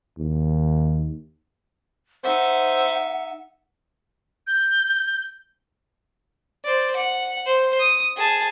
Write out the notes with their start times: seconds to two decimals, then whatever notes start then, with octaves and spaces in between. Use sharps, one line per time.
0.18 D#2
2.24 D#4 C5 E5 F#5
4.47 G6
6.64 C5 D5
6.96 F#5
7.46 C5
7.80 D#6
8.17 G#4 A5